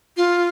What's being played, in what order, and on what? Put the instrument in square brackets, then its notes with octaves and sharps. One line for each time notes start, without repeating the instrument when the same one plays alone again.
[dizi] F4